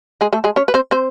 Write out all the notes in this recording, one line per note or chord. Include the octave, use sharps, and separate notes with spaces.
G#3 G#4
A3 A4
G#3 G#4
C#4 C#5
B4
C4 C5
C4 C5